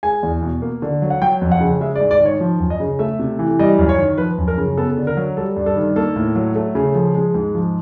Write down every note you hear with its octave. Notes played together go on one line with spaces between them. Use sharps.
G#3 G#5
E2
B2
A#3
D3
F#3
F#5
F#3 G5
F2
F#5
C#3
G#3 E5
D5
G#2
D5
D#3
C#5
F3
F#2
D#5
C#3
A3 E5
C3
E3
G3 D#5
F#2
C#5
D#3
F3 B4
F#2
A#4
C#3
B3 A4
D3
A#4
F#3
G3 A4
G2
A4
D#3
A#3 A4
A2
F#3
A3
C#3
F3
G#3
G#2
F3